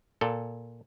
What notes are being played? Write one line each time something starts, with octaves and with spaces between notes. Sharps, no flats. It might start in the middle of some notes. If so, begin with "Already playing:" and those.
A#2 A4